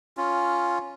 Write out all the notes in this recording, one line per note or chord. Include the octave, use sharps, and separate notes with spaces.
C#4 F4